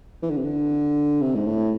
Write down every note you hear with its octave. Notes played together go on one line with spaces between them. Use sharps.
E3
D3
C3
D3
C3
G#2
A2